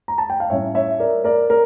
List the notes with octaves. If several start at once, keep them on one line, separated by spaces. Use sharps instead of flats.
A#5
A5
G5
F5
A2 G3 C#4 E4 C#5 E5
C#5 E5
A#4 D5
A#4 D5
A#4